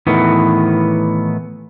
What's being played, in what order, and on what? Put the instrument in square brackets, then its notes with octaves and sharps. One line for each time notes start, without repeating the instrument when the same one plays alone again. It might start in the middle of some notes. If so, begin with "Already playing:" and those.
[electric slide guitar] A2 D#3 E3 B3